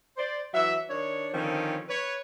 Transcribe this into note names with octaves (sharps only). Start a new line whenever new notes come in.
C5 D5
E3 F#3 E5
D#3 D4 C#5
D3 D#3 F3 C4 C#4
B4 C#5